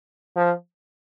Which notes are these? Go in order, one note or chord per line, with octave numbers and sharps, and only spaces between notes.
F3